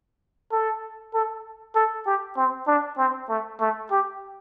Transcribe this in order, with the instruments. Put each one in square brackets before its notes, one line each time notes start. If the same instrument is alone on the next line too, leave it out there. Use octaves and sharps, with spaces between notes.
[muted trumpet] A4
A4
A4
G4
C4
D4
C4
A3
A3
G4